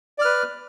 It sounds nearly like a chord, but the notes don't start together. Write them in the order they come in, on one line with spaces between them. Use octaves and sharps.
D5 F6 B4